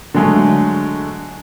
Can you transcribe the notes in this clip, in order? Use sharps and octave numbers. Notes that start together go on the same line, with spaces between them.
D3 F#3 G#3 A3